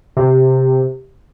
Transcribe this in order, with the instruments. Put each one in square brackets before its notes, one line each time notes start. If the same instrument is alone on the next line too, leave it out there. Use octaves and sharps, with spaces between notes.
[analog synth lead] C3